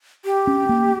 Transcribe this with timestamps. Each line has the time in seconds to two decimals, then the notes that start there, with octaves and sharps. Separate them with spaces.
0.25 G4
0.47 C#4
0.69 A#3